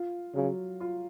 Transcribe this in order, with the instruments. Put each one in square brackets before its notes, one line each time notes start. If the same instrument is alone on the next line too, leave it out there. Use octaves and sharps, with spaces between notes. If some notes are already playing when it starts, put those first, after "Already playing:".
Already playing: [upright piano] F4
[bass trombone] C#3 [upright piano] F#3
[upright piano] F4